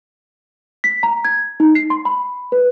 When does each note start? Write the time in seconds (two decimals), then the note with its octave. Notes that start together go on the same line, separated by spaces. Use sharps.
0.84 B6
1.03 A#5
1.25 G#6
1.60 D#4
1.75 C7
1.90 C6
2.05 B5
2.52 B4